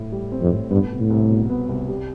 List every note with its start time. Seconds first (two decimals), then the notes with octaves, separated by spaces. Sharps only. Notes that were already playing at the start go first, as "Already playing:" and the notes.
Already playing: A2 E4
0.12 G3
0.32 C4
0.41 F2
0.52 A2
0.71 G2 B3
0.91 C2
1.00 A2
1.10 C2
1.30 B2
1.50 B3
1.69 C2
1.88 G3